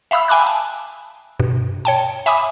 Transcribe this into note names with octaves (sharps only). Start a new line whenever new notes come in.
E5 F5 B5 D#6 E6
G5 G#5 B5 D6 F#6
A5
G2 B2
C#5 G5 A5
E5 G#5 B5 D6 D#6